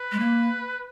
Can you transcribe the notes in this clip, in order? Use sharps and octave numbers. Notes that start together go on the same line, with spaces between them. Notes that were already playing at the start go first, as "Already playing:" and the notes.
Already playing: B4
G#3
A#3